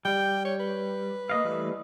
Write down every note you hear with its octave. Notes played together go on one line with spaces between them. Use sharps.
G3 G5
C#5
B4
A#3 D#5 F5
E3 G3 A3